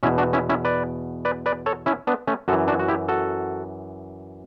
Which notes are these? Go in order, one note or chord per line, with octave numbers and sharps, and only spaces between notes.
E2 B2 C#4 E4
D4 F#4
C#4 E4
C#4 E4
B4 D5
B4 D5
B4 D5
A4 C#5
C#4 E4
B3 D4
A3 C#4
F#2 E3 F#4 A4
D4 F#4
F#4
E4 G4
F#4 A4